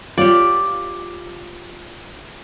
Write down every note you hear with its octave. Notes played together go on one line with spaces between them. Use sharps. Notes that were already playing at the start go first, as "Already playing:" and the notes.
F4 G4 C#5 D5 F5